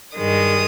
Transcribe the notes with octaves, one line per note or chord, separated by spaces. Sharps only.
G2 D#3 G#3 D#6